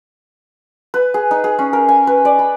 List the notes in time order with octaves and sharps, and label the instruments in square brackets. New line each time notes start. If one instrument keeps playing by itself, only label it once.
[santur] B4
G#4
D#4
G#4
C#4
A#4
G#5
B4
D5
B5